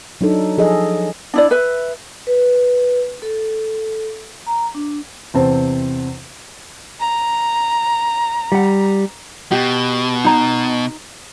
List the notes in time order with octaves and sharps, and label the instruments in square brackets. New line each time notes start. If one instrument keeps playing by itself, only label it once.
[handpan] F#3 D4 D#4 A4
F3 G#4 A4 D#5
[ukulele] D4 E4 D5
B4 E5
[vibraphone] B4
A4
A#5
D4
[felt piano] E2 C3 C4 C5 A5
[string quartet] A#5
[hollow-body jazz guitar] G3 F#5
[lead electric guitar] B2 [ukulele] G4
[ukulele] D#4 A#5